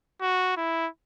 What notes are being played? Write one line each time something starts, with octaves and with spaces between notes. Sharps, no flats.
F#4
E4